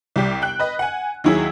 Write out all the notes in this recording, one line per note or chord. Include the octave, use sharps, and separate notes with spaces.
C2 G3 G4
G5 F#6
B4 D#5
F#5 G#5
D#2 F#3 E4 G#4 E6